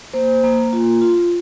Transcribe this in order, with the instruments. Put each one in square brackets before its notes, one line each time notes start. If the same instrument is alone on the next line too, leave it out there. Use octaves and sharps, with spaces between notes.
[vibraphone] A#3 C5
A#3
F4
F4